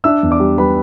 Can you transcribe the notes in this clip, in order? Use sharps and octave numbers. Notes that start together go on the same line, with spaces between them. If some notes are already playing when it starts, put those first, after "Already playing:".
D4 E5 E6
E2
D5 D6
G3
G3 B4 B5